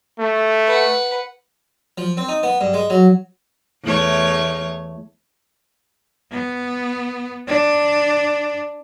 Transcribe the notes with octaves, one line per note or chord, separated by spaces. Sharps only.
A3
B4 F#5
F3
C4
D#4
B3
G2
G#3
F#3
E2 A3 C#5
B3
D4